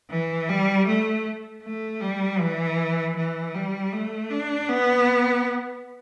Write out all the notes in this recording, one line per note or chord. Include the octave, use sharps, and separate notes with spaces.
E3
G3
A3
A3
G3
E3
E3
G3
A3
D4
B3